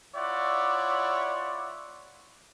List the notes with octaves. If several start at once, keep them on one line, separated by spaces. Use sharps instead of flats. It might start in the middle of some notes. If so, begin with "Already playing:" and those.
E4 F4 C#5 D5 E5 F#5